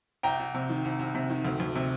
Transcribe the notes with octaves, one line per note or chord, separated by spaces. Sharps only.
C2 G5 A#5
C2
C3
D#3
C2
C2
C3
D#3
D2
D2
C3